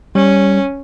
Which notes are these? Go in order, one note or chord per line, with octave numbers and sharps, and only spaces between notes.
G3 C#4